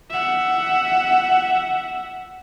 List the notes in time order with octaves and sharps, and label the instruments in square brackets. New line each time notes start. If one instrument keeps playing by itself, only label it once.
[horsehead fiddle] E5 F#5